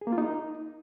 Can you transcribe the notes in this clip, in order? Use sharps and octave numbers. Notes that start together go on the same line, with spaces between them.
G#4
A#3
F4
D#4